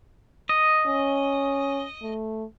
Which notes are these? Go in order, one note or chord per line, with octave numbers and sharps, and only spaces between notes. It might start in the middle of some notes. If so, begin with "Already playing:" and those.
D#5
C#4
A3